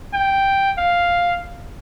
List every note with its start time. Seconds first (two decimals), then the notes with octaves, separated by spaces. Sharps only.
0.14 G5
0.78 F5